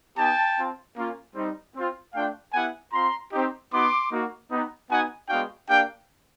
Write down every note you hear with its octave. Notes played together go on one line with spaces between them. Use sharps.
B3 D#4 G4 G5 A5
C4 F4
A#3 C#4 F4
G3 C4 D#4
C4 F4
A3 D4 F4 F5 G5
B3 E4 G4 F#5 G#5
C4 F4 A#5 C6
C4 D#4 G4
B3 D#4 F#4 C6 D6
A#3 D#4 F#4
B3 D#4 G4
B3 D#4 F#4 F#5 G#5
G#3 B3 D4 F#4 F5 G5
A#3 D4 G4 F5 G5